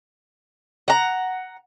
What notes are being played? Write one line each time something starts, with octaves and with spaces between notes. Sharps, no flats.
F#5 A#5